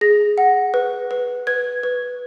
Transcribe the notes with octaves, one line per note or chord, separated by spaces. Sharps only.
G#4 A#6
F#5
B4
B4
B4 G#6
B4